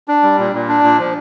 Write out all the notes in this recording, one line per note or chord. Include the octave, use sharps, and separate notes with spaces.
D4
G3
A#2
A#2
D4
A#2
F3